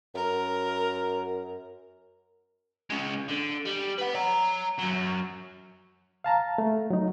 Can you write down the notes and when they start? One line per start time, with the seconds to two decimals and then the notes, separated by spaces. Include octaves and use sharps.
0.15 F#2 A#4
2.90 G#3 C#4
3.28 D3
3.65 G3
3.98 B4 F#5
4.15 C#5 A#5
4.79 F#2 F#3
6.24 F5 A5 A#5
6.58 A3
6.90 F#3 D#4